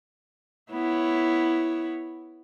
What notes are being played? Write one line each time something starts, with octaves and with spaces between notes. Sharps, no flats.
B3 E4 C#5